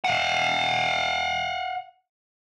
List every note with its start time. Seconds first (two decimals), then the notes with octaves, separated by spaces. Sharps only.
0.04 F5 F#5